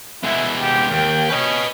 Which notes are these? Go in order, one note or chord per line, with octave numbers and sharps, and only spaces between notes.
G#3 B3 E4
G4
D#2 G5
C#4 B4 D#5